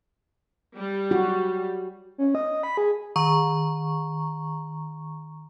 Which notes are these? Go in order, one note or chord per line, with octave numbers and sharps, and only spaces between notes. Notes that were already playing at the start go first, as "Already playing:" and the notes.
G3
F#4
C#4
D#5
B5
G#4
D#3 A#5 C#6